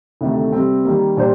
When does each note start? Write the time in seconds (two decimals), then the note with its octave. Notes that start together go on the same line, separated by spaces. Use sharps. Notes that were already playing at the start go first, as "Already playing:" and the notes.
0.21 D2 C3 D#3 A3
0.52 C3 G3 C4
0.85 D#3 G3 A#3
1.17 A#2 G3 D4 G4 C5